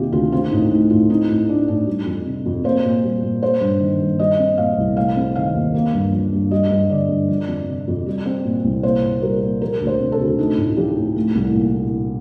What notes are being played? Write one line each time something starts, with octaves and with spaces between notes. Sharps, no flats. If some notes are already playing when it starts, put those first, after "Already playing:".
Already playing: F2 C3 D#3 A#3 F4 G4
D2 F4
C4 F4
A2 D#4
A3 D#4
A2 F4
C4 D#4
A2
A3 D4
A2 D4
G3
F2
C3
F2
A#3 C5
A#2
G3
A#2
A#3 C5
G2
D#3
G2
G3 D#5
C4
A#2 F5
C2
A3 F5
C4
D#3 F5
D#2
A#3
G2
F3
G2
G3 D#5
G2
D3 D5
G2
F3
F2
C3
F2
G3
C4
A#2
C2
A#3 C5
A#2
G3 A#4
A#2
F3 A#4
D2
C5
C3
A4
D2
A3 D#4
A2
F3 G4
A2
A3
C2
A#2